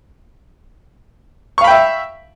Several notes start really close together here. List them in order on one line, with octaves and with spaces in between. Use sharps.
C#6 F5 B5 G5 E5